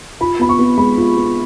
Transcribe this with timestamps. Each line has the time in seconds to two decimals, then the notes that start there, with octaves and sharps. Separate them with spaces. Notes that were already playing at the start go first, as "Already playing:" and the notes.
0.20 F4 B5
0.39 B3 B5
0.49 C#6
0.59 B3
0.78 G#3 B5
0.97 F4
1.17 B3